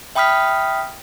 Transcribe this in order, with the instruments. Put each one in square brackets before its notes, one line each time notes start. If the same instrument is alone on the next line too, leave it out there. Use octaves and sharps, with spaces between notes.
[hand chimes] E5 G5 B5 D#6 F6 B6